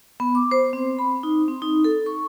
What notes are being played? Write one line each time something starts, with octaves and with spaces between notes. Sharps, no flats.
B3
D6
C5
C4
B5
D#4
C4
D#4
A4
C#6